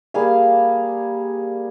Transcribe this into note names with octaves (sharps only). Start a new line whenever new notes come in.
G3 A#3 G#4 F5